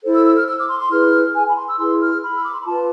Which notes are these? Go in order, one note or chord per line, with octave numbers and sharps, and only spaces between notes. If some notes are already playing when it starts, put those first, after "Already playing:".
E4 A4 C5
E6
E6
F6
E6
D6
C6
C6
E4 G#4 B4 F6
G#5
B5
C6
E6
E4 G#4 B4 C6
F6
B5
E6
D6
C6
B5
F4 B4 A5